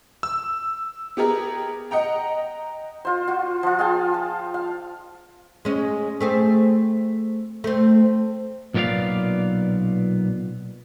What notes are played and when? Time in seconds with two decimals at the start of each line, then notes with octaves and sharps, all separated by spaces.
0.23 E6
1.17 B3 G4 G#4 A#4
1.91 D#5 F#5 G5 A#5
3.05 F4 C5
3.28 F4 F#4
3.63 F3 F4
3.79 G#4 F5 G5 A5
4.14 A5
4.54 F5
5.65 G#3 C#4
6.21 A3 C4 G#4
7.64 A3 C4
8.74 B1 A#2 B3 G4 D5 F5